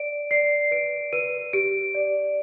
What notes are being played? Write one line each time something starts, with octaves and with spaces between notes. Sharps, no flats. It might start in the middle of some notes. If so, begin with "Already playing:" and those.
Already playing: D5 D7
D5 C7
B4 D7
B4 D#7
G4 D7
D5